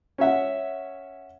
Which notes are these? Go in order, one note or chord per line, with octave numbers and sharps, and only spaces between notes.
C#4 C#5 E5 F#5